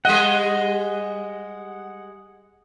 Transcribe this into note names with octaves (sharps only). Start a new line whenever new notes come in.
G3 G#3 D#5 F#5